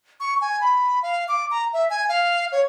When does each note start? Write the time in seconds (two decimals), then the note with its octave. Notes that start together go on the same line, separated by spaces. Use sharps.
0.20 C#6
0.41 G#5
0.61 B5
1.03 F5
1.28 D6
1.51 A#5
1.73 E5
1.90 G#5
2.09 F5
2.52 C#5